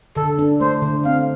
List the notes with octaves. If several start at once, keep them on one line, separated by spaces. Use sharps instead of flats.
D3 A4
D4
A3 C5
D3
C4 F5